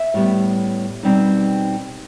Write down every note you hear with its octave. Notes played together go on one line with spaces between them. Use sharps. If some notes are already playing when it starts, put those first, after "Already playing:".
Already playing: E5
A2 G3 B3
B2 G3 C4 D#4